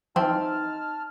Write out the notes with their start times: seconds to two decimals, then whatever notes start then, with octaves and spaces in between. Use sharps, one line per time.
0.16 E3 F3 C4 D#4 A5 F6